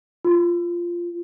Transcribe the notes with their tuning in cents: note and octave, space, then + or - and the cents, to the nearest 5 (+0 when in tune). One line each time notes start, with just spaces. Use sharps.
F4 -10